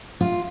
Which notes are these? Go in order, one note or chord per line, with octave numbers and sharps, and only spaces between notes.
F4